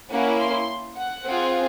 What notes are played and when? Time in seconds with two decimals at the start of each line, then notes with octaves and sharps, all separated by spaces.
0.11 A#3 C#4 E4 F#5
0.39 C6
0.96 F#5
1.25 C4 F4 G#4